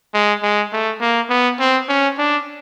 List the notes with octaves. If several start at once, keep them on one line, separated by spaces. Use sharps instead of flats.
G#3
G#3
A3
A#3
B3
C4
C#4
D4